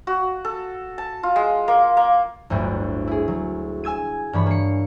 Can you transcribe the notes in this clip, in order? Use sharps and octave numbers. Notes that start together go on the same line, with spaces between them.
F#4
A4
A5
F4
G#3
A#3
A#3
G1 D2 A2 F#3
E4 G#4
F#3
G#5 E6 G#6 D#7
G2 E3 C#5 B5
A#3 C#7